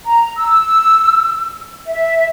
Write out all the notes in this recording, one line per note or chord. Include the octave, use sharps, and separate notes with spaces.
A#5
E6
E5